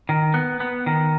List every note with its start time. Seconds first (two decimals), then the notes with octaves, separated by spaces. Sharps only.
0.09 D#3
0.34 B3
0.60 B3
0.86 D#3